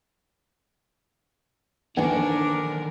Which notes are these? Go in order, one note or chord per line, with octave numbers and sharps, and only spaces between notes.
D3 D#3 D4 A#4 G#5 C#6